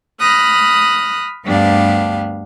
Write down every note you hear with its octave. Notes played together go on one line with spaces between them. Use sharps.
B5 D#6 F6 F#6 A#6
D2 G2 B3 D4 G4 F5